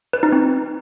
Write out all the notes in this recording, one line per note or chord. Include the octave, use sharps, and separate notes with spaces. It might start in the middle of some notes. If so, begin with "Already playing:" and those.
B4
D#4
C4